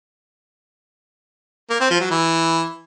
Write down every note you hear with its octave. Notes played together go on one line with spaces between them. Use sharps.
A#3
C4
F3
F#3
E3